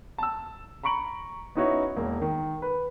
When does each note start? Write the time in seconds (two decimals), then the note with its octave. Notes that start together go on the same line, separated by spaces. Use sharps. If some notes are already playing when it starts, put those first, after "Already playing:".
0.18 A5 E6
0.83 A#5 B5 C#6 D7 F#7
1.55 B3 C#4 D#4 E4 F#4 C#5
1.96 E1 A#3
2.21 D#3
2.62 B4